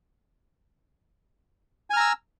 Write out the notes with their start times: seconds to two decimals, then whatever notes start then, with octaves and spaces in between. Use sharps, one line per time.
1.90 G#5
1.93 F6
1.97 A#5
2.00 E6